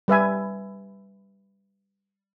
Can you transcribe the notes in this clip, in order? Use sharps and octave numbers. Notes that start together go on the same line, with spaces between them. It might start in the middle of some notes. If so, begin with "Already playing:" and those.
G3 B4 E5 G#5